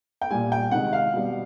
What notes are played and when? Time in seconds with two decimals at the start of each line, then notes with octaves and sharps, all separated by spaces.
0.21 G5
0.30 A#2 G3 G#5
0.52 G5
0.71 C3 D#3 G#3 F#5
0.93 F5
1.13 B2 G3